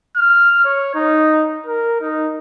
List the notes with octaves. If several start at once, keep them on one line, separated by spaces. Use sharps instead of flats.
F6
C#5
D#4
A#4
D#4